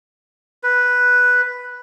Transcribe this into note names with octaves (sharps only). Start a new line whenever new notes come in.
B4